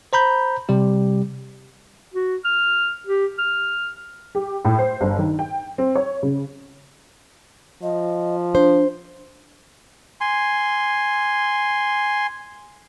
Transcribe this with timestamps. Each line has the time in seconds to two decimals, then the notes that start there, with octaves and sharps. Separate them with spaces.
0.13 C5 A#5 B5 G6
0.69 C3 G3 G4
2.14 F#4
2.45 F6
3.07 G4
3.38 F6
4.35 G4
4.65 A2
4.79 C5
5.01 G1
5.19 D#3
5.39 G5
5.78 C4
5.95 C#5
6.23 C#3
7.83 F3 D#5
8.55 D4 C5
10.21 G#5 C6